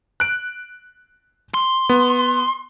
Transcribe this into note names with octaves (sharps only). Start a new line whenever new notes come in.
F#6 D7
C6
B3